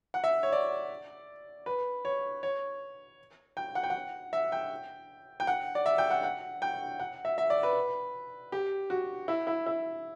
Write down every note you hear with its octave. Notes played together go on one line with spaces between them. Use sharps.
F#5
E5
C#5
D5
B4
C#5
C#5
G5
F#5
G5
F#5
E5
G5
G5
F#5
D5
E5
G5
F#5
F#5
G5
F#5
E5
E5
D5
B4
G4
F#4
E4
E4
E4